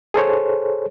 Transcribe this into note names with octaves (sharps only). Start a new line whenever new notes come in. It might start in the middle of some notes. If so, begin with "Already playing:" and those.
G#4 A4 C5 C#5